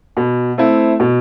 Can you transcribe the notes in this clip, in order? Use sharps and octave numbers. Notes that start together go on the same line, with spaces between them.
B2
A3 C4 E4
B2